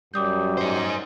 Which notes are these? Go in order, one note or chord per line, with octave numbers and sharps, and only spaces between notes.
F#2 G3 D6 D#6 G6
D#4 C5